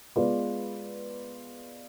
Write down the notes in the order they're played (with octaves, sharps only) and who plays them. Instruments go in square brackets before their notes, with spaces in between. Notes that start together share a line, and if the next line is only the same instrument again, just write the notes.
[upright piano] G#3 B3 F4 B4 D5